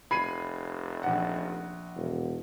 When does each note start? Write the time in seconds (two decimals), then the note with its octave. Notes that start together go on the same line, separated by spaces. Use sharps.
0.11 F1 B5 G#6 C7 D#7
1.03 A#1 F#5
1.96 E1